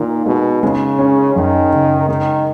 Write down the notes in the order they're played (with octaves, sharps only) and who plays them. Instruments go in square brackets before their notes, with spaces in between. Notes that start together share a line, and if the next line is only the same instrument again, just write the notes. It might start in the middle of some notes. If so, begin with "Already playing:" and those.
Already playing: [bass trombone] A#2 [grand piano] D#3
[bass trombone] B2 [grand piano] G#3
[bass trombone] C#3 [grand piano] G#3
[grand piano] C#4
[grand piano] F#2 [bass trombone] D#3
[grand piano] C#3
[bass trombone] D#3 [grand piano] G#3